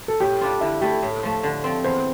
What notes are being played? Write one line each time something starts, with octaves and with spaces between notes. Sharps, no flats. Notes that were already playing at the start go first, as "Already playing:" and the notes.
A4
A2 G4
G3 D4 F4
D3 E4
A3 E4 G4
A2
F3 A3
D3
F3 C4
E2 C5